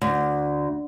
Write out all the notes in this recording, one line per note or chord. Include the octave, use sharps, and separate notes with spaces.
D2